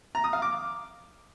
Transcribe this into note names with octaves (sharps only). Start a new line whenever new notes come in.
A#5
D#6
F5
D6